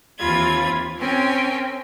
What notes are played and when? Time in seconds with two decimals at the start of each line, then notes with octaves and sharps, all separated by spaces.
0.19 D#2 E3 C4 F4 B5 G#6
0.99 C4 C#4 A#4 G5 G#5